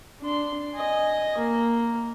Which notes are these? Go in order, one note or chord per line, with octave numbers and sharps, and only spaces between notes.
D4 C6
D#5 G#5
A#3